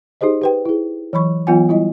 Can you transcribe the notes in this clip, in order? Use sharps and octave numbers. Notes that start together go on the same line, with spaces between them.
D#4 G4 G#4 C5 D#5
G4 B4 G5
E4 G#4
E3 F#3 B5 C#6
E3 F#3 B3 F4 F#5 G#5
G3 E4 D#5